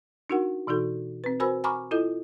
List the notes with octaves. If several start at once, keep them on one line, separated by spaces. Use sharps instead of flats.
D4 D#4 F#4 A#4 F#5
B2 E3 D#4 F#4 A4
C4 B4
F#4 A#4 C5 G#5 B5 E6
G#5 A#5 B5 C#6 D6 F6
E4 F4 A4 D#5